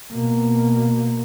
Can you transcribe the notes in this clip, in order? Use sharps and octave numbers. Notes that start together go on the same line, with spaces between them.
B2 A#3